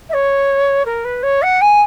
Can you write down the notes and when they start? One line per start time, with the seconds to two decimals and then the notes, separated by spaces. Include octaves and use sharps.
0.09 E5
0.13 C#5
0.85 A#4
1.04 B4
1.23 C#5
1.42 F#5
1.61 G#5